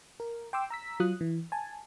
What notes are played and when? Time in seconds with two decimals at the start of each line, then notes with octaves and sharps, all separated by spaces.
0.20 A#4
0.53 G5 C6 D6 E6
0.70 A#5 E6 B6
1.00 F#3 F4 D#6 F#6
1.21 E3
1.52 G#5 A5